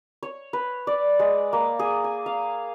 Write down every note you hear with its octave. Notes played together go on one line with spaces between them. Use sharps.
C#5
B4
D5
G#3
A#3
G#4
G#5
F5